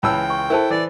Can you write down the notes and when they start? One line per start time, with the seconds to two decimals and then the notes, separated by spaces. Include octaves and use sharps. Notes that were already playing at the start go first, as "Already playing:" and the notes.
0.03 C#2 E3 C#5 G5 A5 B5 E6
0.30 C#6
0.50 E4 A4 A#4 C5 A5
0.71 E3 D5